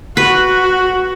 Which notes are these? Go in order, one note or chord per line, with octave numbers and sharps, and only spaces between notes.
F#4 B4